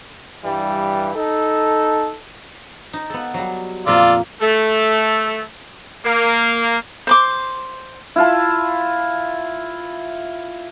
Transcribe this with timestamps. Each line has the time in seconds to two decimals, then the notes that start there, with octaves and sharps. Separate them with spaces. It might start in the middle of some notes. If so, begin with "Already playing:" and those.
0.44 G2 E3 G3
1.15 D#4 A4
2.93 D#4
3.10 B3 A4
3.34 F#3 G3
3.87 F2 A#2 A#3 F4 D5 E6
4.41 A3 A4
6.05 A#3
7.07 C5 C6 D6
8.16 E4 F4 A5